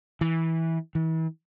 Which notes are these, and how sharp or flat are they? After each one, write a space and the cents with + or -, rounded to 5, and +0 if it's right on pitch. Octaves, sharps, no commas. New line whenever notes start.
E3 -15
E3 -35